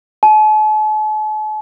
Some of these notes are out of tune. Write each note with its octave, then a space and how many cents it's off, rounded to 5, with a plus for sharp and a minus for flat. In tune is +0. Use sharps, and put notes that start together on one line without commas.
A5 -45